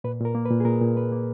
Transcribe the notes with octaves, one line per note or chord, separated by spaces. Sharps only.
A#2 B4
A#2 A#4
A#3
B4
A#2
G#4
A#2 A#4
A#2
A#3 B4
A#3